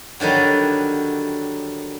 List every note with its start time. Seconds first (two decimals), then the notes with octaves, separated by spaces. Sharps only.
0.20 D3 D#3 F#3 G3